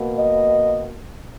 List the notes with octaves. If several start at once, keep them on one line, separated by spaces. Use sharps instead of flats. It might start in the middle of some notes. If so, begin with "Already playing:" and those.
Already playing: B2 A#3
D#5